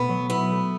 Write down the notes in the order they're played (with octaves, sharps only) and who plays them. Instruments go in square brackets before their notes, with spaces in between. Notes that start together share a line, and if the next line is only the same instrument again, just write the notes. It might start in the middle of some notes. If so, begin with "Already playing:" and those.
Already playing: [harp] B2 A3 [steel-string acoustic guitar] B3
[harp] F#3
[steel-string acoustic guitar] B3 [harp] E4
[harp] A3